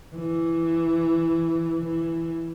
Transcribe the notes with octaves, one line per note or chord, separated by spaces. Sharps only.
E3
E3